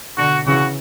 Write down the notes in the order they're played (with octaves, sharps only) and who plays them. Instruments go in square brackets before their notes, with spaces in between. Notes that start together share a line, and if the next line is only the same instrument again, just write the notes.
[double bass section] B2 D3 [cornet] F#4
[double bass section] C#3 E3 [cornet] F#4